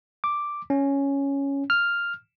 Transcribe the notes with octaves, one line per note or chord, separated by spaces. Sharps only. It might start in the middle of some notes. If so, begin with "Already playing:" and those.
D6
C#4
F6